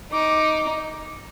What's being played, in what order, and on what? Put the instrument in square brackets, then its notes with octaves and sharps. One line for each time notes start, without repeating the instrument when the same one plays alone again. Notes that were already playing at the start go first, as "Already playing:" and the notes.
[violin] D#4 [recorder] D6